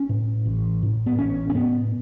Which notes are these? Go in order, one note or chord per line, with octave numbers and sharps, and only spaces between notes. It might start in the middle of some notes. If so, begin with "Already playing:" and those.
Already playing: C#4
A2
A1
A2
B3
A1 C#4
C#4
A2 B3